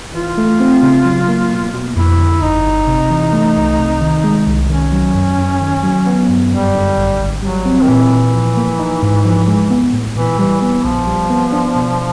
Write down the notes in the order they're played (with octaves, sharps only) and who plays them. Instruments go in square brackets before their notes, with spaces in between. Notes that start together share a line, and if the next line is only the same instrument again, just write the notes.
[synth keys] E3 [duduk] F4
[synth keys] A3
C4
C#3
F#3
A#3
B2
B2
[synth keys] F2 [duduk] E4
[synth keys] D3
[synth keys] G1 [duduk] D#4
[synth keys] G1
C3
E3
A3
C2
C3
D#3
G#3
C2
[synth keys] D#3 [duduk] C#4
[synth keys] F#3
F#2
F#2
D#3
F#3
B3
G2
[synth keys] F#2 [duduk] G3
[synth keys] D3
G#1
G#1
[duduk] F#3 [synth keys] G3
[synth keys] C4
[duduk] D#3
[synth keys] A#2 [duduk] E3
[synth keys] A#2
F3
A#3
D#4
G#2
F3
G#3
B3
A2
[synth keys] A#2 [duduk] E3
[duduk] E3 [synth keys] G3
[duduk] E3 [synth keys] B3
[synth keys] A#1 [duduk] F3
[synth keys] G3
B3
D4
B2